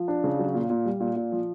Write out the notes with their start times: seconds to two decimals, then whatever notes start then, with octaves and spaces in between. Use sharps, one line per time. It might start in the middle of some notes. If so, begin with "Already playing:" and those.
Already playing: F3
0.08 D4
0.24 C#3
0.39 F#3
0.54 A#2
0.70 A#2
0.85 G3
1.00 A#2
1.16 A#2
1.32 F3